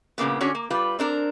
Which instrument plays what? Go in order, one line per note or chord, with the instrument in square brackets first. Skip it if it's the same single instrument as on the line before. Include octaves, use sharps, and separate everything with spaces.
[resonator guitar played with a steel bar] G2 A#2 C#3 A#3 B3
D3 C#4 D4 F#4 G#4 C#5
A#3
G3 F4 B4
C4 D4 A#4